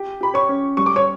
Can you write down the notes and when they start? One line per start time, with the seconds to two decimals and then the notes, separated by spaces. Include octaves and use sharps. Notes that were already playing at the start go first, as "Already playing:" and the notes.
Already playing: G4
0.21 G4 B5
0.34 C#5 C#6
0.49 C#4
0.77 G3 C#6
0.86 D6
0.96 C#5 C#6